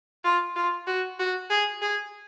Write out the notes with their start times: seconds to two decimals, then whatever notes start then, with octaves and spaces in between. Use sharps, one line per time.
0.24 F4
0.56 F4
0.87 F#4
1.19 F#4
1.50 G#4
1.82 G#4